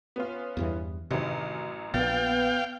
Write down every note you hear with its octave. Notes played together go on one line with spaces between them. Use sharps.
B3 C#4 F4
E2 G2 E3
A1 F#2 C3 D#3
A#1 A#2 B3 F5 G5 A6